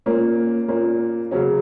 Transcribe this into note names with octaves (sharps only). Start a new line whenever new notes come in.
A#2 A#3 C#4
A#2 A#3 C#4
C#3 F#3 C#4